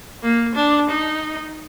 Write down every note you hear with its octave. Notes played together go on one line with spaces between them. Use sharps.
A#3
D4
D#4